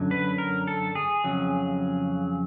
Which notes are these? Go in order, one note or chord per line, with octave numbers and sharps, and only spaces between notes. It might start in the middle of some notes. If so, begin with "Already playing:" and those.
Already playing: F#2 D3 F#3
B4
A#4
A4
G#4
F2 C#3 F#3